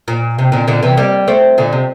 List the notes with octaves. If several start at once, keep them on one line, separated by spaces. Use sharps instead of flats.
A#2
C3
A#2 D3
A#2 D3
C3 E3
G3 A#3
A3 C4
A#2 D3
C3